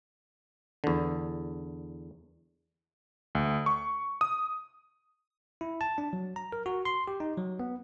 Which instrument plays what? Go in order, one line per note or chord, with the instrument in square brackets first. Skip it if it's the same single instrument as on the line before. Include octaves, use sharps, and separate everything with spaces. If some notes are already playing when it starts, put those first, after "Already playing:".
[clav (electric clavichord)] E2 D3
[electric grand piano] D2
C#6
D#6
[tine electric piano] E4
A5
D4
F#3
A#5
A#4
F#4
C6
G4
D#4
F#3
B3